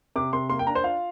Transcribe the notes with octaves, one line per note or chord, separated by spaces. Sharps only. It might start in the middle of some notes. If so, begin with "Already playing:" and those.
C3 D6
C3 C6
A#3 C6
G5
D4 A#5
C5
F4 F5